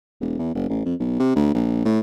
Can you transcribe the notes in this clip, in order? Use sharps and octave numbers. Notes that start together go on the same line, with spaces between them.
E1
E2
F#1
A1
F2
B1
C3
D2
A#1
A2